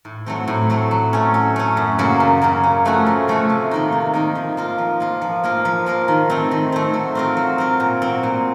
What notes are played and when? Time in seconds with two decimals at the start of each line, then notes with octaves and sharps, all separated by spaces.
0.05 A2
0.26 F#3 A3 C4
0.48 A2
0.70 F#3 A3 C4
0.91 F#3
1.13 A3 C#4
1.34 F#3
1.56 A3 C#4
1.77 F#2
1.99 C#3 F#3 A#3
2.20 F#2
2.42 C#3 F#3 A#3
2.63 C#3
2.85 F3 A3 C#4 F#4
3.06 C#3
3.28 F3 A3 C#4 F#4
3.50 C3
3.71 D#3 A#3 D#4
3.92 C3
4.14 D#3 A#3 D#4
4.35 F3
4.57 A#3 F4 A#4
4.78 F3
5.00 A#3 F4 A#4
5.22 F3
5.44 A#3 F4 A#4
5.65 F3
5.86 A#3 F4 A#4
6.08 D#3
6.30 A3 C4
6.51 D#3
6.72 A3 C4
6.94 F#3
7.15 C4 F4 A#4
7.37 F#3
7.58 C4 F4 A#4
7.80 A#2
8.02 F#3 C4
8.23 A#2